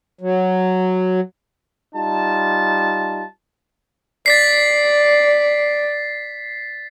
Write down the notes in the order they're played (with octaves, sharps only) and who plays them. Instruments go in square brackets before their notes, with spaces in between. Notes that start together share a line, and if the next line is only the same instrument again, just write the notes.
[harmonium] F#3
[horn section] G3 D#4 F4 A5
[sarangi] D5 [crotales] A6 B6 C7